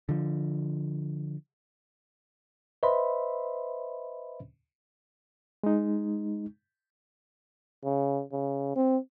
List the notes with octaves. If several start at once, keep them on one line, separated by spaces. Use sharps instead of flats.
D3 F3
B4 C5 D#5 E5 B5 C6
G#3 D#4
C#3
C#3
C4